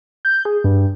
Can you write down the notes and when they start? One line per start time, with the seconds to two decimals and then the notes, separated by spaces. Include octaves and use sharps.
0.25 G6
0.45 G#4
0.64 G2